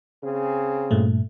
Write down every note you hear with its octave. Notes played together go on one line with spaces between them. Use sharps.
C#3 C4 G#4
G2 A#2 A3